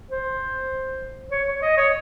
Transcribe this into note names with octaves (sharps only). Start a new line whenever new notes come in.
C5
C#5
C#5
D#5
C#5